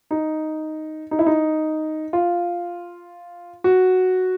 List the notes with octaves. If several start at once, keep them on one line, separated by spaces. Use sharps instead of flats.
D#4
D#4
E4
D#4
F4
F#4